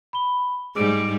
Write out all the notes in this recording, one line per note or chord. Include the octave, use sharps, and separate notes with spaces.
B5 G7
G#2 G3 G#4 D6 D7